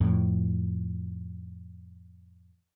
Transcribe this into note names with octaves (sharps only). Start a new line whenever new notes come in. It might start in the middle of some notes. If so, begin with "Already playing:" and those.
F2 A2